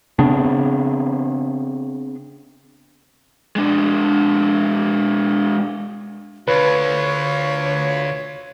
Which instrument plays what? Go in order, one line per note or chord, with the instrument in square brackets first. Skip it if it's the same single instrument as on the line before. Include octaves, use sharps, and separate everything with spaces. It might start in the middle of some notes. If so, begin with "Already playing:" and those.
[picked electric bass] C#3 B3 C4 D4
[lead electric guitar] G#3 D4
[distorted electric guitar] D2 D3 [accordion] F4 [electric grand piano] B4 [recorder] C#5